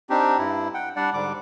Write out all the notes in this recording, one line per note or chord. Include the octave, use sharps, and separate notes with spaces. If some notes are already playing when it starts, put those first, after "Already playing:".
C4 D4 D#4 G4
G2 E4
F#5 G5
G3 D4 D5 F#5
G#2 D3 G3 D6